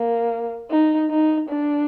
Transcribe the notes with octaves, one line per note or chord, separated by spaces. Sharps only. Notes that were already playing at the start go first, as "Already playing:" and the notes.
Already playing: A#3
D#4
D#4
D4